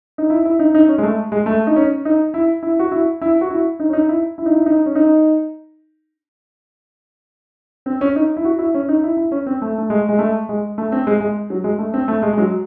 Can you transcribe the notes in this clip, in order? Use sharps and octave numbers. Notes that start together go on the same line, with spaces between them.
D#4
E4
E4
D#4
D#4
C#4
G#3
A3
G#3
A3
D#4
C#4
D#4
E4
E4
F#4
E4
E4
F#4
E4
D#4
C#4
D#4
E4
E4
D#4
E4
D#4
C#4
D#4
C4
C#4
D#4
E4
F#4
E4
C#4
D#4
E4
E4
C#4
C4
A3
A3
G#3
G#3
A3
G#3
A3
C4
G#3
G#3
F#3
G#3
A3
C4
A3
G#3
G#3
F#3